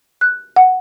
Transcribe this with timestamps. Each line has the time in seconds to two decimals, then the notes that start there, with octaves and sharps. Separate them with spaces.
0.21 F#6
0.56 F#5